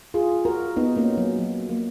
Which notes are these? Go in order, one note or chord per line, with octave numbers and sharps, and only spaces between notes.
F4 G#4
F#4 A#4
B3 D#4
A#3 C#4
F#3
F#3
F#3 A#3